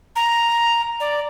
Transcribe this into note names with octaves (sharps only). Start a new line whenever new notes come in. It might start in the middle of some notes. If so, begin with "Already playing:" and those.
A#5
D5